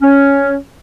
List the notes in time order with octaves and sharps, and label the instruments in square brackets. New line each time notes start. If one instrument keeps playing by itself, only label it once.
[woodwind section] C#4